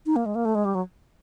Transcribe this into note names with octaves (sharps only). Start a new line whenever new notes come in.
D#4
A#3
G#3
A#3
A3
G#3
G3
F#3